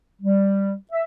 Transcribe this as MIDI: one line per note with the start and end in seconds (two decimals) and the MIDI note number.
0.22 0.76 55
0.92 1.03 76